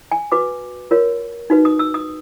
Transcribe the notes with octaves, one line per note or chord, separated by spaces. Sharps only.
G#5
F#4 B4 D6
F4 A#4 C#5
D#4 F#4 B4
D#6
E6
D#6